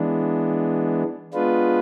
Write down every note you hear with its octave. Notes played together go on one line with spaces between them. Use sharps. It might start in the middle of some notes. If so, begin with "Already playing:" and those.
Already playing: E3 G#3 B3 D4
G#3 B3 D4 F4 B4